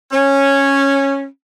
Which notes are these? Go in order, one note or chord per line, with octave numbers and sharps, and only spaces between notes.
C#4